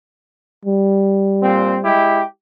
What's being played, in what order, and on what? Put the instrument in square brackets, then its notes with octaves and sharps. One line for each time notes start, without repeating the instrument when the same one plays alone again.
[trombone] G3
[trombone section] A#2 C4
G#3 E4 G4